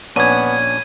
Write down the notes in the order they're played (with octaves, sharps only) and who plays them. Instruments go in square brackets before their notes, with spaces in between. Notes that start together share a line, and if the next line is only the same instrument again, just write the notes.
[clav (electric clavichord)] A#1 C#4 D4 [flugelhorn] B3 [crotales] G#6 D#7